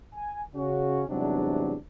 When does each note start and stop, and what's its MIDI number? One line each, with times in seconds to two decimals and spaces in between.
0.15 0.40 80
0.55 1.04 49
0.55 1.04 61
0.55 1.04 66
1.09 1.76 40
1.09 1.76 44
1.09 1.76 48
1.09 1.76 54
1.09 1.76 55
1.09 1.76 62